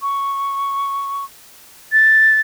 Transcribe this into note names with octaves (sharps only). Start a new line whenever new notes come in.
C#6
A6